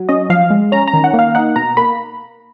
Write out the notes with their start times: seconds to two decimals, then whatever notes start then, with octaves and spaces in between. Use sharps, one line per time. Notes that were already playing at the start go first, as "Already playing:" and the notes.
Already playing: F#3
0.09 C#4 D#5
0.30 F3 F5
0.50 G#3
0.72 C#4 A#5
0.87 A#5
0.94 D#3
1.04 F#5
1.14 A#3
1.19 F5
1.35 D#4 F#5
1.56 B2 A#5
1.77 A#3 B5